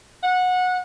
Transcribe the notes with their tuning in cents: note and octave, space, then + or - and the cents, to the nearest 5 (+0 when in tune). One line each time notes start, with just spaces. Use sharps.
F#5 -20